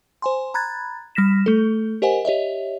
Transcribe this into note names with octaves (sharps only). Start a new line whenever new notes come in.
C5 G#5 C6
A#5 B5 F#6 G#6 A6
G3 F6 A#6 B6 E7
A3 A4
G4 A#4 C5 D#5 F#5 G#5
G4 C#5 D#5 E5